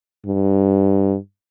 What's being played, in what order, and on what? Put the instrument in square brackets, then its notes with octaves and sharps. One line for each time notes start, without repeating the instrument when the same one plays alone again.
[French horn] G2